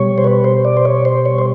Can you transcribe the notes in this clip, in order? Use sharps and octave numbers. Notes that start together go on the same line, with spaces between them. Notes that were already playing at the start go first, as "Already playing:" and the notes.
Already playing: B2 G3 C#5
C5
B4
C5
D5
C5
C#5
C5
C#5
C5